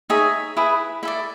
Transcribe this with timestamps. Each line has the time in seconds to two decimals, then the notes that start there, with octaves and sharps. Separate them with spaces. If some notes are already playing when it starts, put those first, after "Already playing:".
0.10 D#4 G#4 C#5 E5
0.57 E4 G#4 B4
1.03 E4 A4 D5 E5